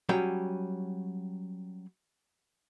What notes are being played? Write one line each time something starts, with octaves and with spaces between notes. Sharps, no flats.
F#3 G3 C#4 G5